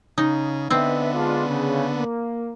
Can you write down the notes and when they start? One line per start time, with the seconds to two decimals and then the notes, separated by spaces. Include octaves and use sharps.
0.18 C#3 D#4
0.70 D3 B3 C4 B4 D#5 E5
1.14 G#3 D4 F4
1.47 C#3
1.94 A#3